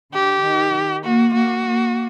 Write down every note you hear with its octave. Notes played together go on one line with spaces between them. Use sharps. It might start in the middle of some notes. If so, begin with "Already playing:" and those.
D3 G4
D#3
A#3 F#4
A#3 F#4
A#3